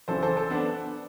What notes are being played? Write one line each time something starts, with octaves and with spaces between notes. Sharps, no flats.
F#1 F#2 E3 A4 C5
A4 C5
A4 C5
B3 D4